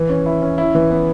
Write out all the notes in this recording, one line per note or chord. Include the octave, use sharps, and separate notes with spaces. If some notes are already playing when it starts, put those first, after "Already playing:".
Already playing: E3
C#4
E4
C#4
E4
E3
B3